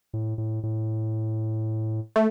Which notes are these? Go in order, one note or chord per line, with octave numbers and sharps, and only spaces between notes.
A2
A2
A2
A3